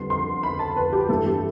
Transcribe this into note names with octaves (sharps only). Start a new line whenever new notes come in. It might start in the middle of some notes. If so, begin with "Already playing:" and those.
Already playing: F2 D3 G3 B3 C6
C6
B5
A5
B4
G4
G2 E3 A3 A4
G4